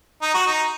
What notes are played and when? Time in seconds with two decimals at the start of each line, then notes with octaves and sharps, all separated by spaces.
0.22 D#4
0.34 F#4
0.46 D#4